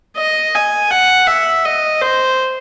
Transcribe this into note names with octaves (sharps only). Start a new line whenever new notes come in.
D#5
G#5
F#5
E5
D#5
C5